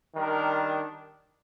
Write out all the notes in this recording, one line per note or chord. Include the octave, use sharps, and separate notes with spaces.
D#3 G3 D4 A#4